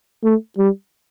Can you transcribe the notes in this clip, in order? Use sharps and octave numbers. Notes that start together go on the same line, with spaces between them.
A3
G3